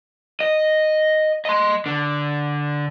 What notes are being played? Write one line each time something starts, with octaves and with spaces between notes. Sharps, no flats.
D#5
D#5 C6
D3